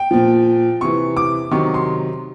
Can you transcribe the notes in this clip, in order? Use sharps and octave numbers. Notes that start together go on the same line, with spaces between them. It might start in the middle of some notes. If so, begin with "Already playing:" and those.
Already playing: G5
A#2 F3
C3 E3 C#6
D6
C3 D#3 F#3 C#6
C6